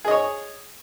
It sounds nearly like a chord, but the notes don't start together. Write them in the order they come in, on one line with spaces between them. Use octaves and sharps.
G#4 D#5 C#5